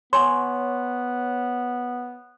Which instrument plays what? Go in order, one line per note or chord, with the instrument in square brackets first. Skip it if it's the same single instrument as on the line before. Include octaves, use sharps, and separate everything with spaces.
[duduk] B3 [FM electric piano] C#5 [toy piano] F#5 G#5 C6